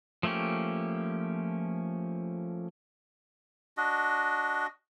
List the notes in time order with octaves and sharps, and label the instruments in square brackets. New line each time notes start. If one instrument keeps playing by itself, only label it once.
[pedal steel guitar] F3 A3 A#3 C#4 G4
[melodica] D4 F#4 D#5